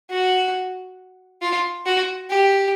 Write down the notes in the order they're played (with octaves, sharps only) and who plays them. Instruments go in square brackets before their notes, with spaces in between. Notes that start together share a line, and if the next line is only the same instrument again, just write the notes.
[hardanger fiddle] F#4
F4
F#4
G4